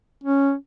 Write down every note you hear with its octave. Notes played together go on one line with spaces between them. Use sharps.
C#4